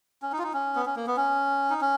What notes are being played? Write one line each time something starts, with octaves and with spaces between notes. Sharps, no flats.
C#4
D#4
F4
D#4
C#4
B3
C#4
A#3
B3
C#4
D#4
C#4